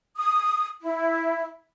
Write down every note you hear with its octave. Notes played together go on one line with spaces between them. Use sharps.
D#6
E4